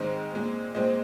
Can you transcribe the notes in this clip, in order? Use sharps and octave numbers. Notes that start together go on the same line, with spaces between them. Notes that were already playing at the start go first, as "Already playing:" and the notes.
Already playing: G#2 D#3 G#3 C4 C5 D#5
A#2 G#3 C4
A#2 G#3 C4 C5 D#5